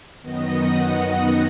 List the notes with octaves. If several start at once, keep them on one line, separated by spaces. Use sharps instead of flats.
F#2 D#3 B3 D#5
F#5